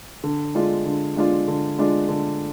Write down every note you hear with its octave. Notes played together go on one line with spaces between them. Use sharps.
D3
G#3 D4 F4
D3
G#3 D4 F4
D3
G#3 D4 F4
D3